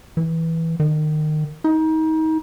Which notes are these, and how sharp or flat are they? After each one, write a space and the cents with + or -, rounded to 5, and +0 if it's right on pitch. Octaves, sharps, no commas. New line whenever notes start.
E3 -10
D#3 -25
D#4 +30